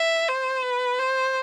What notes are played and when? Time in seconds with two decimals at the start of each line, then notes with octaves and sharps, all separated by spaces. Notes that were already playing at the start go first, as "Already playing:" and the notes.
Already playing: E5
0.28 C5
0.64 B4
0.99 C5